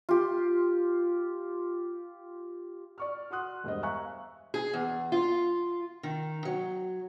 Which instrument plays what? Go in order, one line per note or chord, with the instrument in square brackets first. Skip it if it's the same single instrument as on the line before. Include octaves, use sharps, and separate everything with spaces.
[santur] F4 G4
[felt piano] D5 C#6 F6
F#4 F#5 C6 D#6 F#6
E1 G2 C5 D#5
E5 F5 G#5 A#5 C#6 F#6
[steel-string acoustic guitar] G#4
E2
F4
D#3
F#3